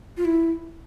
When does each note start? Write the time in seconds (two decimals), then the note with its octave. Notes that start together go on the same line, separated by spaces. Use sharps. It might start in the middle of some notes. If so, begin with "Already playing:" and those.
0.17 F4
0.25 E4